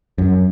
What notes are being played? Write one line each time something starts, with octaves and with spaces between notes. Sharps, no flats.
F#2